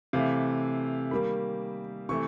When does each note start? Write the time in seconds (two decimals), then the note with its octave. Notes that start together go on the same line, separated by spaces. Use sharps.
0.13 C3 E3 A3 F5
1.11 D#3 G3 A#3 B5
2.09 C3 E3 A3 C#6